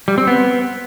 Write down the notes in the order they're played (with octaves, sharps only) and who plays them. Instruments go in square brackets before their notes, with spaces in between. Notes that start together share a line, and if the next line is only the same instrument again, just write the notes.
[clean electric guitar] G3
C4
B3